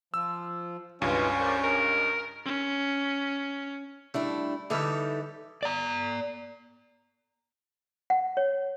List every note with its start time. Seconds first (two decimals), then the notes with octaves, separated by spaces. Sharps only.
0.14 F3 E6
1.02 C#2 G2 B2 E3 C#4 F4 G#5
1.40 A#4 C5 D5
1.64 A#4 D#5
2.45 C#4
4.14 G3 A3 D4 E4
4.70 D3 E3 G3 D#4 A4 E5
5.63 D5 A#5
8.10 F#5
8.37 C#5